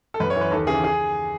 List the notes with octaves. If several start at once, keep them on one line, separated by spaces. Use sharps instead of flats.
A4
F#2 B4
C#5
E3
B4
D#2 A4
C#3 E3 G#4
G#4